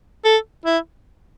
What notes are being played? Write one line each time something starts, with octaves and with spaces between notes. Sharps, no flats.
A4
E4